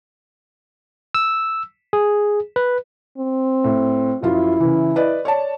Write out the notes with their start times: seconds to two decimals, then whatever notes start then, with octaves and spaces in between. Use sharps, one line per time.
1.15 E6
1.93 G#4
2.56 B4
3.18 C4
3.64 A2
4.23 F#2 F3 E4 F4
4.60 C#3 E3
4.96 B4 D5 D#5
5.25 C#5 D5 A5